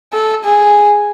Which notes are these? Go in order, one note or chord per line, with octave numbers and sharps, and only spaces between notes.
A4
G#4